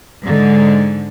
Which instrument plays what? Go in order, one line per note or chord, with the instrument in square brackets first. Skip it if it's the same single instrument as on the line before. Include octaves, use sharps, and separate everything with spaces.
[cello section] G#2 D3 G#3